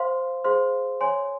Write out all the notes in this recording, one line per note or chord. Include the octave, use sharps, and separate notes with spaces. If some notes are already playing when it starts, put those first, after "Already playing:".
Already playing: C5 F5 C6
G#4 C5 F5 C6
C#5 G#5 C6